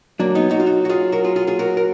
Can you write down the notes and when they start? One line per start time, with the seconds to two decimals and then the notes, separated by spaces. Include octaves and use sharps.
0.20 F#3 A#3 D4
0.35 B3 D#4
0.51 D#4 F#4
0.60 F4
0.66 D#4 F#4
0.85 F#4
0.89 F4 G#4
1.12 F#4 A#4
1.24 F4 G#4
1.36 F4 G#4
1.47 F4 G#4
1.59 F#4 A#4
1.77 A#4